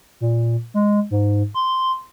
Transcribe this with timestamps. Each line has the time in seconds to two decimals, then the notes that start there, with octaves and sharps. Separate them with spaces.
0.21 A#2
0.74 G#3
1.11 G#2
1.54 C6